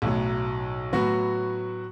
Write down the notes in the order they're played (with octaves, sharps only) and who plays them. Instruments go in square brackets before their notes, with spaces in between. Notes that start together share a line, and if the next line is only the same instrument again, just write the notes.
[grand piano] B1 A2 F#3
A2 F#3 B3 F#4